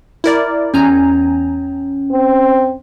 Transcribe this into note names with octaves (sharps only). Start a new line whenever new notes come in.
E4 A#4 D5
E2 C#4 G#5 A#5
C4